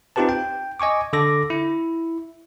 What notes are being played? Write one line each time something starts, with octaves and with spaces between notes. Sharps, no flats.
C4 D#4 F4 G4 B4 A5
G5
D#5 G#5 C#6 D6
D3 A4 D6 A#6
E4